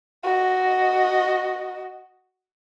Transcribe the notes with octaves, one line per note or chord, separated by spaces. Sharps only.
F#4 D#5